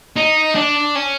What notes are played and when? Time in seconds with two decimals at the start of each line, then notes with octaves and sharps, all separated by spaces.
0.16 D#4
0.55 D4
0.95 C#4